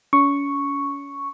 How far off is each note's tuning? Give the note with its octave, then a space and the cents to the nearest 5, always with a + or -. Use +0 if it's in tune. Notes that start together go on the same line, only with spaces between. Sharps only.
C#4 +35 C#6 +0